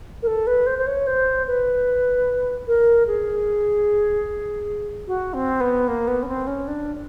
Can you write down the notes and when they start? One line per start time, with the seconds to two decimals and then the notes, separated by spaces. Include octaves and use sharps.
0.22 A#4
0.27 A4
0.47 B4
0.67 C5
0.78 C5
0.87 C#5
1.07 C5
1.47 B4
2.67 A#4
3.07 G#4
5.07 F#4
5.34 C4
5.61 B3
5.88 A#3
6.08 B3
6.23 C#4
6.28 C4
6.47 C#4
6.68 D4